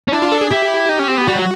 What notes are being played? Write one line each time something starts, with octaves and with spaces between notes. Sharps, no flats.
C#4
D4 E4
F4
A4
G#4
E4 G4
D#4
C#4
C4
B3
G3 F#4
F#3